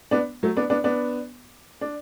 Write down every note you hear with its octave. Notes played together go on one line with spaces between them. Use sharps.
B3 D4
F#3 A3
B3 D4
B3 D4
B3 D4
D4